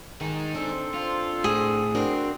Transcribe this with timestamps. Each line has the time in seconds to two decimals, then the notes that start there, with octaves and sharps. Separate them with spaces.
0.21 D#3 D#4 G#4
0.55 C4 D4 A4 C5
0.94 F4
1.44 A2 G#4
1.95 C4 D4 F#4 A#4